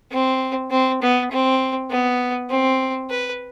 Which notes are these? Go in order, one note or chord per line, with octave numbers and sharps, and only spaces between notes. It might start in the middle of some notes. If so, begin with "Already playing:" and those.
C4
C4
B3
C4
B3
C4
B4